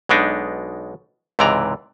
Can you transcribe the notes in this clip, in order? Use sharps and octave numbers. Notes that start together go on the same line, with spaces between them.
B1 B2 G#3 D4 D#4
C#2 G#2 C3 E3 D5 A#5